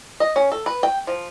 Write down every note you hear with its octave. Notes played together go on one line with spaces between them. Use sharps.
D#5
C#4
A4
B4
G5
F3